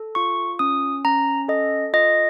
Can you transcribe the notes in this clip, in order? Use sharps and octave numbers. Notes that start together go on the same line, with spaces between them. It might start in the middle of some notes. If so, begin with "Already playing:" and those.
Already playing: A4
F4 C#6
C#4 D#6
C#4 A#5
A4 D#5
F4 D#5